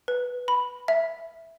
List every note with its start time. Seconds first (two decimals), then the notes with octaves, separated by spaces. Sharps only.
0.08 B4
0.48 B5
0.88 E5